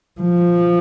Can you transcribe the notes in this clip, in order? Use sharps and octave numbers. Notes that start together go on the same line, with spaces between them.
F3